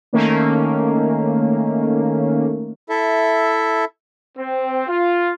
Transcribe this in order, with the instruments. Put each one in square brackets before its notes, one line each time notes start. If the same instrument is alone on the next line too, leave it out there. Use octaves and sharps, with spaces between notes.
[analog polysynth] D#3 A3 A#3 C#4
[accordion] E4 A4 E5
[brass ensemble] C4
F4